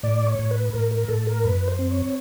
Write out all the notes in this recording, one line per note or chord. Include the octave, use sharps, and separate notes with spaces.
A2 D5
C#5
A2
B4
A2 A#4
A#4
A2 A4
A#4
F#2 B4
C5
C4
C#5